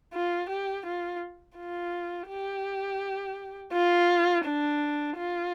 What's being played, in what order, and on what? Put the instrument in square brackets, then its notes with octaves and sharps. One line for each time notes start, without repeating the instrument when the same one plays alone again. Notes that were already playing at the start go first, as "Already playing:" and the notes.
[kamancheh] F4
G4
F4
F4
G4
F4
D4
F4